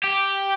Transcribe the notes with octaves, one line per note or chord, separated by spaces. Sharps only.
G4